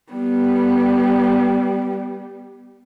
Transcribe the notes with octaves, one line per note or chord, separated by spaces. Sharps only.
G3 B3